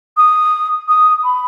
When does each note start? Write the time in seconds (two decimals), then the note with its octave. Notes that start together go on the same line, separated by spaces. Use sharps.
0.17 D#6
0.88 D#6
1.24 B5